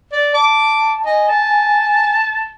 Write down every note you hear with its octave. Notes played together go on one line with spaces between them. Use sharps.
D5
A5 D6
D#5 G#5
A5